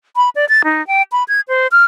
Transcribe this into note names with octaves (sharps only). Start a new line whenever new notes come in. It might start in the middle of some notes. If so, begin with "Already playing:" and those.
B5
D5
A6
D#4
G5
B5
G#6
C5
F6